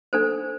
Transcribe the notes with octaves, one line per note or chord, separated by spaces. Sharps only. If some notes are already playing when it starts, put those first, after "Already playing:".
D4 A4 C5